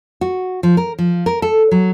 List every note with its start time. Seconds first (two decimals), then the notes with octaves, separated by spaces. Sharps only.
0.21 F#4
0.63 F3
0.77 A#4
0.99 F3
1.26 A#4
1.42 A4
1.71 F#3